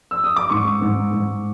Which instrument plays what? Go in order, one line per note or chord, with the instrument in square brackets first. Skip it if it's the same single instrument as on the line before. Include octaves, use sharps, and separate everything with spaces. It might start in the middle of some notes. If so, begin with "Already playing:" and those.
[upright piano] E6
D#6
D6
[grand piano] G#2 [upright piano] C#6
[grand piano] G#2
G#2